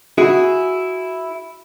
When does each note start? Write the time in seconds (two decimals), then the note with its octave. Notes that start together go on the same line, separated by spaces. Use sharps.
0.18 E4 F#4 G#4